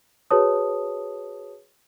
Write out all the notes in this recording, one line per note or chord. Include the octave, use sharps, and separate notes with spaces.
F#4 G#4 B4 C#5 A5 D#6